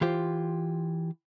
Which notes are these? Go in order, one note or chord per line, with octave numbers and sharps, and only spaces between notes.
E3 F4 G4 C5